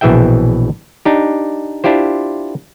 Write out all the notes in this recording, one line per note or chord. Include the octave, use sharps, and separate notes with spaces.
A#1 B2 E3 G#4 E5 G5
D4 D#4 G4
D4 E4 F4 G4 C5